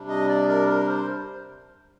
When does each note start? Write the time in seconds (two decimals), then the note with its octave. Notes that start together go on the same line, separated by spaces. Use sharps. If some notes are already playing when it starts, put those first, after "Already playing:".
Already playing: C3 G3 D4
0.09 D#5
0.28 D5
0.49 A#4
0.68 A#4
0.89 C5